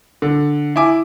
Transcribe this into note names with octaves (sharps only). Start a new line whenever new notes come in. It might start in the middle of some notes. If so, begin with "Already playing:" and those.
D3
E4 G#5 D6